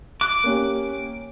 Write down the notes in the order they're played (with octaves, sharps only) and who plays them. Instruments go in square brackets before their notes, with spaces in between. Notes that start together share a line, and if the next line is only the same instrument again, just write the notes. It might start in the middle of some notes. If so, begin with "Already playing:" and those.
[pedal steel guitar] D6 [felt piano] F#6
[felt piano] A#3 C#4 G4